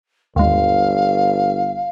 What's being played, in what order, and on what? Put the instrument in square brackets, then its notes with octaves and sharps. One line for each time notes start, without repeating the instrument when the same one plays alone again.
[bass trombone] G1 [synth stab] D#2 G#2 [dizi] F5